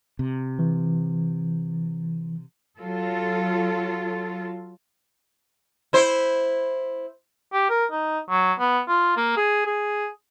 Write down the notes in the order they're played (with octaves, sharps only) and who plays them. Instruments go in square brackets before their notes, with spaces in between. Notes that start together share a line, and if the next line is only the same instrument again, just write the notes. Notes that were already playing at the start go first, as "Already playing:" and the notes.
[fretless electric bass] C3
[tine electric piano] E3
[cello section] F#3 F4 A4
[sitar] E4 C5
[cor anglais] G4
A#4
D#4
F#3
B3
F4
A#3
G#4
G#4